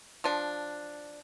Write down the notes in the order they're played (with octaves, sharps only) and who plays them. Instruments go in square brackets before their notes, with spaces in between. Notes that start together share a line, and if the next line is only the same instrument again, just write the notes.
[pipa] F3 D4